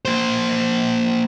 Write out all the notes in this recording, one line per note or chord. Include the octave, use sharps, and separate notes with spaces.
A#3 C5